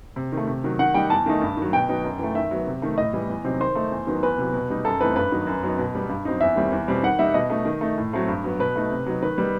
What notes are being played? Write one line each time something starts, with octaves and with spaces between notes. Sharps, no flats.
C3
D#3 A3
C3
D#3 F#3
D#3 F#5
G3 D#4 G5
E2 A5
D#3 A3 D#4
G2
D#3 F#3
B2 G5
F#3 B3 D#4
F#2
E3 A3
D#3 E5
F#3 B3
C3
D#3 A3
A2 D#5
E3 G3
E2
C3 F#3 C4 D#4
D#3 C5
A3 D#4
E2
D#3 F#3 B3 D#4
E2 B4
C3 F#3
B2
G3 D#4
F#2 A4
E3 A3 C4 D#4 B4
G2 B4
D#3 F#3 B3 D#4
F#2
F#3 B3 D#4
B2
G3 B3
G2
F#3 C4 D#4
E2 E5
D#3 G3 C4
E2
B2 G3 C4
D#3 F#5
G3 D#4 E5
B2 D#5
A3 D#4
D#3
A3 D#4
A2
F#3 A3 C4
G2
F#3 B3
B2 B4
A3 D#4
C3
F#3 B3 D#4
D#3 B4
G3 B3 D#4